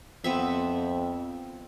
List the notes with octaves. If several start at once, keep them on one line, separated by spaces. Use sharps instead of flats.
F2 B3 C4 E5